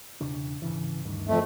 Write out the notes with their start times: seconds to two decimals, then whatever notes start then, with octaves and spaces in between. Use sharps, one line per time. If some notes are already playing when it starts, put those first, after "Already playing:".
0.21 E1 C#3 D4
0.62 G#1 C#3 E3
1.05 D2 G2 D#3
1.28 F2 A3